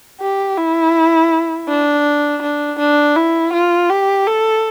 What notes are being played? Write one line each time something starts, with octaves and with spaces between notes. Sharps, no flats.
G4
E4
D4
D4
D4
E4
F4
G4
A4